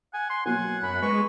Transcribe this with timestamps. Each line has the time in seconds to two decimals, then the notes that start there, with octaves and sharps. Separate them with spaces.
0.14 F#5 G#5
0.30 C6
0.46 B2 F#3 A#3 F#5 G#5
0.83 F#2 B5
1.02 G#3 B4 C#6